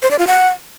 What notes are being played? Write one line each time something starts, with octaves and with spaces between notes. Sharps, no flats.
C5
D5
F4
F#5